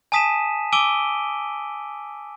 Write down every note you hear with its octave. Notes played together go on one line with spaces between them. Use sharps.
G#5 A5 D#6 B6 D#7 E7
G#5 D6 E6 D7 D#7 G7